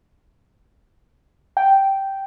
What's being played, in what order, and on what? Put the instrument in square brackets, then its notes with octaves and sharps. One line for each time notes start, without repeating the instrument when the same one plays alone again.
[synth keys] G5